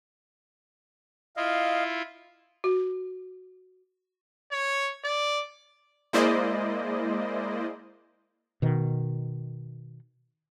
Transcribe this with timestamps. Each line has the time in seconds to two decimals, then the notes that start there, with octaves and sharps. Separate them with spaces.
1.37 E4 F4 D#5 F5
2.64 F#4
4.52 C#5
5.04 D5
6.13 G#3 A#3 E4 C5 D5 D#5
8.62 B2 D#3